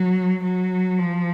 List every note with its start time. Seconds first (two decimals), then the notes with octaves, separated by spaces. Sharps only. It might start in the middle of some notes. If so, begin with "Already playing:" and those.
Already playing: F#3
0.44 F#3
0.98 F3